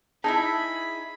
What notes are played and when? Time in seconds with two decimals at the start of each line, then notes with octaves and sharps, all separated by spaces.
0.24 D#4 E4 G#4 E5 A5 B5